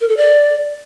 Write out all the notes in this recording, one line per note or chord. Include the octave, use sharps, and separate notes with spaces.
A#4
A4
D5